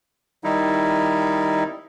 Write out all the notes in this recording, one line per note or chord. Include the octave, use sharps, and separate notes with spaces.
D#3 G3 D#4 E4